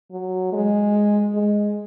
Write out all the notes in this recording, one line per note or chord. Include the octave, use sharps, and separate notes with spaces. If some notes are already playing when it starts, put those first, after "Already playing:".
F#3
G#3
G#3